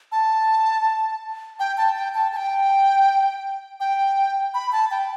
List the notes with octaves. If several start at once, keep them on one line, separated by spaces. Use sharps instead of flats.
A5
G5
A5
G5
A5
A5
G5
G5
B5
A5
G5